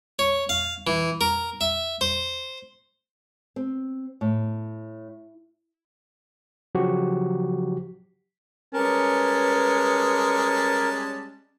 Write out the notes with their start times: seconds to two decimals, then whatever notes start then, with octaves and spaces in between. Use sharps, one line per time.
0.19 C#5
0.49 F5
0.87 E3
1.21 A#4
1.61 E5
2.01 C5
3.56 C4
4.21 A2
6.75 C#3 F3 F#3 F#4 G4
8.73 G3 G#3 C#4 A#4 B4 A5